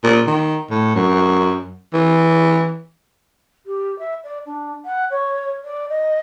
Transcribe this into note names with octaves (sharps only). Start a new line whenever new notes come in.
A#2
D#3
A2
F#2
E3
G4
E5
D5
D4
F#5
C#5
D5
D#5